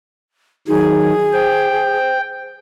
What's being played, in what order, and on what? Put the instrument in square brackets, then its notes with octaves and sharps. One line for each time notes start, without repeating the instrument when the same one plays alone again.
[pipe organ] D#3 F#3 [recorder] D#4 [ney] G#4
[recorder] C5 [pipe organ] G5